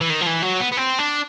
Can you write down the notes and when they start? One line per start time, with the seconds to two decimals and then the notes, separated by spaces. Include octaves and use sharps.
0.01 E3
0.10 D#3
0.21 F3
0.27 E3
0.42 F#3
0.60 B3
0.72 B3
0.77 C4
0.99 D4